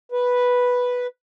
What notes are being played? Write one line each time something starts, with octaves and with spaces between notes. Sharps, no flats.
B4